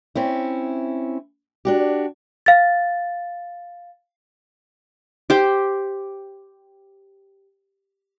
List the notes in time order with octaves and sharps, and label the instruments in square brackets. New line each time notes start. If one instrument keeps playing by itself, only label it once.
[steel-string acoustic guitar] C4 C#4 E4
D4 F#4 G4
[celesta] F5 A6
[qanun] G4 C5 G5